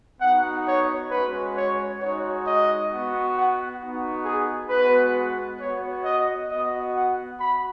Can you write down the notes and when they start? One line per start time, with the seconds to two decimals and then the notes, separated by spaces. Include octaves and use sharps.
0.21 B3 D#4 F#4 F#5
0.67 C#5
1.11 G#3 C#4 F#4 B4
1.56 C#5
2.01 G#3 D#4 F#4 C#5
2.46 D#5
2.91 B3 F#4
3.35 F#5
3.80 B3 D#4 F#4
4.25 G#4
4.69 G#3 B3 F#4 B4
5.60 B3 F#4 C#5
6.04 D#5
6.49 B3 D#5
6.54 F#4
6.94 F#5
7.39 F#4 B5